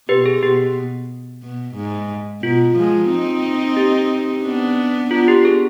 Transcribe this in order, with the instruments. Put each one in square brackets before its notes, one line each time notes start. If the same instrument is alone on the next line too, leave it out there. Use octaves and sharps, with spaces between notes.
[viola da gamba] B2 [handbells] G4 B4
[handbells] G#4
[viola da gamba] B2 [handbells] G4
[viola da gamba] B2
G#2
[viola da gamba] B2 [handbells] F4
[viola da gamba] F3 G#3
C4 D#4
[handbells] G4
[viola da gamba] B3 D4
[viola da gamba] B3 D4 [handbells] F4
[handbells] G4
G#4